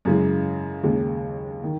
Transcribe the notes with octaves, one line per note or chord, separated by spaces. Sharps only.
F#2 C#3 E3 G#3
D#2 C#3 G#3
D#3